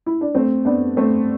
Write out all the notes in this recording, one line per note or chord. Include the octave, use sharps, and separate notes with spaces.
E4
D4
A3 C4
B3 D4
A3 C4